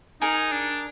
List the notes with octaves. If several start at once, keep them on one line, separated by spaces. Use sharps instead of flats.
D#4 G#4 A#4
D4